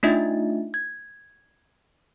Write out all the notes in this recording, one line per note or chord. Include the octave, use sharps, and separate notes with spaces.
A3 D4 D#4 F4 D#5 E5
G#6